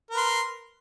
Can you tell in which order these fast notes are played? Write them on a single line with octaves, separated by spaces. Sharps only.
A#4 B4 C6